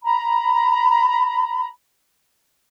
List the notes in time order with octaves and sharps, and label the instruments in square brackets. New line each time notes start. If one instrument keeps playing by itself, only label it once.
[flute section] A#5 B5